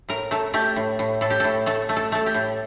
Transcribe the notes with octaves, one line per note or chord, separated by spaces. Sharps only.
A2 A#4
A3 A4
A3 G4
A2
A2
A2 A4
G4
A2 A4
A3 A4
A3
A4
A3 A4
G4
A2